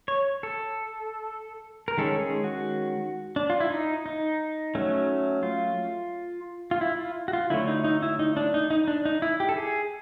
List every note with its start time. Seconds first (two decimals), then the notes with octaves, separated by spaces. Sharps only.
0.08 C#5
0.43 A4
1.88 A#4
1.97 D#3 G#3 C#4 A4
2.20 G#4
2.44 F#4
3.36 D4
3.50 F4
3.60 E4
3.70 D#4
4.06 D#4
4.75 F#3 A3 C#4
5.43 F4
6.71 F4
6.81 E4
6.98 F4
7.28 F#4
7.33 F4
7.50 D3 F#3 A3 E4
7.67 D#4
7.84 D#4
8.03 E4
8.19 D#4
8.37 D4
8.54 D#4
8.70 D#4
8.88 D4
9.05 D#4
9.22 E4
9.40 G4
9.49 A4
9.57 G#4